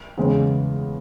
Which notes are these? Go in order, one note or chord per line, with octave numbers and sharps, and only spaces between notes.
E2 C#3 G#3